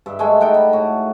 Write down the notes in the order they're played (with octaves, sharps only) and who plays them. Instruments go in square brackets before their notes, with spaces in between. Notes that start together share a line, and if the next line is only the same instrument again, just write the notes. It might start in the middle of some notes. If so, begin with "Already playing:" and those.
[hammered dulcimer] G2 E5
G#3 A3 G5 G#5
D#4 F#5 G5 A5
G3
A2 F#4